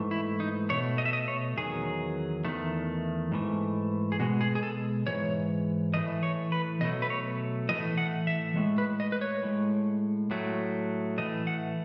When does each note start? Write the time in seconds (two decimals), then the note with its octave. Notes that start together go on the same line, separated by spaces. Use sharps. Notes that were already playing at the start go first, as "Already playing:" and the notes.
Already playing: G#2 E3 A3
0.11 E4
0.40 D#4
0.69 B2 A3 C#5
0.98 D#5
1.05 E5
1.13 D#5
1.28 C#5
1.57 E2 D#3 F#3 G#4
2.45 E2 D#3 A3
3.32 G#2 E3 A3
4.12 G#4
4.20 B2 G#3 F#4
4.41 G#4
4.55 G#4
4.63 A4
5.07 G#2 E3 C#5
5.94 A2 E3 A3 D#5
6.23 C#5
6.52 B4
6.81 B2 F#3 A3 D#5
7.02 B4
7.10 C#5
7.69 A2 E3 A3 D#5
7.98 F#5
8.27 E5
8.56 A2 G#3
8.78 B4
9.00 D#5
9.12 B4
9.21 C#5
9.43 A2 G#3
10.31 A2 F#3 A3
11.18 A2 E3 A3 D#5
11.47 F#5